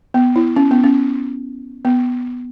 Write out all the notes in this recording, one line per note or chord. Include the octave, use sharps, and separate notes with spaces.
B3
E4
C#4
B3
C#4
B3